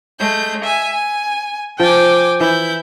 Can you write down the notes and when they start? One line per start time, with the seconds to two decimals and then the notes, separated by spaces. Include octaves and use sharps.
0.20 G#3 A3 G6
0.63 E5 G#5
0.93 G#5
1.80 F3 G5 G#5 D6
2.40 E3 E4 G6